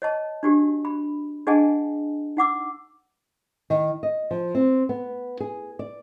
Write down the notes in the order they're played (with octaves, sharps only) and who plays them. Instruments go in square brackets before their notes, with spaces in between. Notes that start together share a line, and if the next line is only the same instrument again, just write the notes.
[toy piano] C#5 D#5 A5
D4 F#4 G4
B5
D4 G#4 D#5 F#5 G#5 A5
D#4 F#5 D6 E6
[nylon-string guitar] D#3
D#5
F3
C4
B3
G#4
D5